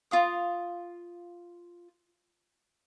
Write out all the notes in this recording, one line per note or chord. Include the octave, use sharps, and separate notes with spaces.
F4 F5 D#6